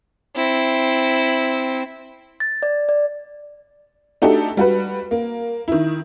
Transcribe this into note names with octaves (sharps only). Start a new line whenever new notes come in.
C4 E4
A6
D5
D5
A3 D4 D#4 F#4 G4 A4
G3 F#4 B4
A#3
D#3 E4